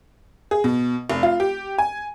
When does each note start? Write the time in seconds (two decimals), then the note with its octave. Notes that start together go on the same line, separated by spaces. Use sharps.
0.51 G#4
0.64 B2
1.10 F1
1.23 F4
1.40 G4
1.78 G#5